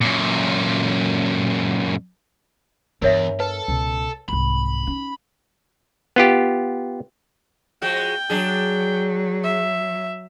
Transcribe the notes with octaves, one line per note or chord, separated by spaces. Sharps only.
F#2 A#2
E2 G2 B3 A#4 C#5 E5
A4 B4
C#2 B2
C2 G#2 B5
C#4 D#4
B3 F4 G4
F3 G#3 F#4 G5
F#3 D4 G#4
E5